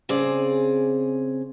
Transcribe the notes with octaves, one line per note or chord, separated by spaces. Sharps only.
C#3 C4 G#4 D5